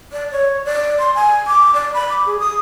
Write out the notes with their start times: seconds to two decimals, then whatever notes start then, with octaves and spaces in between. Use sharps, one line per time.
0.12 D5
0.32 C#5
0.65 D5
0.99 C6
1.15 G#5
1.47 D6
1.74 D5
1.94 B5
2.09 D6
2.26 G#4
2.40 D#6